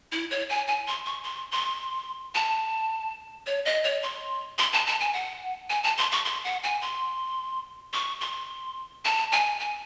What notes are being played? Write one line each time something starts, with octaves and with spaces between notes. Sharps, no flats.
E4
C#5
G#5
G#5
C6
C#6
C6
C6
A5
C#5
D#5
C#5
C6
C6
A5
A5
G#5
F#5
G#5
A5
C6
C#6
C6
F#5
G#5
C6
C#6
C6
A5
G#5
G#5